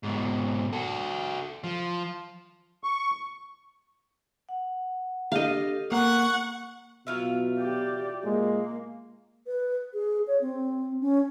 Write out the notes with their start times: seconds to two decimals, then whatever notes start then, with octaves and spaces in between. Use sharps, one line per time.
0.03 G#2 B2
0.73 F#4 A4
1.64 F3
2.84 C#6
4.49 F#5
5.32 D4 G4 A4 D#5 F5
5.92 A#3 F#5 A#5 C#6
7.07 B2 F#3 F4 E5
7.59 G4 D5
8.25 A#2 G#3 A#3
9.47 B4
9.94 G#4
10.27 C#5
10.41 C4
11.00 C#4